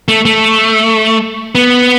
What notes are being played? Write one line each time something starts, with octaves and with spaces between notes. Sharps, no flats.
A3
A3
B3